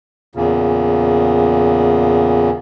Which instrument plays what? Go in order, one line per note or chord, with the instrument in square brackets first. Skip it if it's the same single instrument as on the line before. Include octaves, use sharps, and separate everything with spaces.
[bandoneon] E2 A#2 C#3